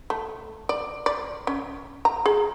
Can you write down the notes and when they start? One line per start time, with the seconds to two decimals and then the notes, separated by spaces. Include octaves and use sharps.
0.10 A3
0.69 D5
1.06 D5
1.47 C#4
2.05 A#5
2.26 G#4